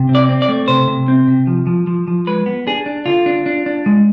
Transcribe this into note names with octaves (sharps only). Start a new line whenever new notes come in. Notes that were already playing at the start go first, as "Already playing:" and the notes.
Already playing: C3
C4
D5
C4
D5
A3
C3 C5
C3
C4
C3
F3
F3
F3
F3
G#3 B4
B3
D4 G#4
D4
D3 F4
D4
D4
D4
G#3